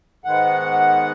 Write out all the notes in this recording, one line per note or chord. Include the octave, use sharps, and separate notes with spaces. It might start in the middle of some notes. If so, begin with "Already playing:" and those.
G#2 D#3 G#3 B3 F#5